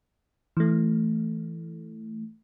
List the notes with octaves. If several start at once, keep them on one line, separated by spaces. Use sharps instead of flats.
E3 A3